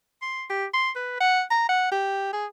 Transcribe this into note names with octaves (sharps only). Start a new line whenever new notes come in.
C6
G4
C6
B4
F#5
A#5
F#5
G4
G#4